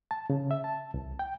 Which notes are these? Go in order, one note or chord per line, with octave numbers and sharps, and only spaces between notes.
A5
C#3
E5
A5
C2
G5